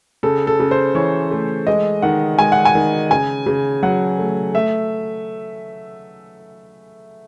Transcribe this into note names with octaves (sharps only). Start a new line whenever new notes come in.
C#3 A4
A4
C#3
C5
E3 C#5
A3
G#3 D#5
D#3 F#5
G#3 G#5
F#5
G#5
D#3
C#3 G#5
C#3
F#3 F#5
A3
A3 E5